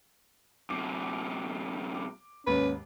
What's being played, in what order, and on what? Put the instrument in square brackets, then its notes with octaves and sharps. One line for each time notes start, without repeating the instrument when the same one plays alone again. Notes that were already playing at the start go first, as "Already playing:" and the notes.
[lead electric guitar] F#2 C3 [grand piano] D6
[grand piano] D6
[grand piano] D#2 G#2 [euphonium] C#4 [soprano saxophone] B4